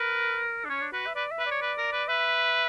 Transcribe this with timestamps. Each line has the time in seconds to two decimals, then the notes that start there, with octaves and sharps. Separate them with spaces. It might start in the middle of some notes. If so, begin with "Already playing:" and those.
Already playing: A#4 B4
0.65 D4
0.70 C#4 C#5
0.82 D4
0.93 F#4 B4
1.07 E5
1.15 B4 D5
1.31 E5
1.39 B4
1.46 C#5 D5
1.62 B4
1.78 A#4
1.93 B4
2.08 B4 E5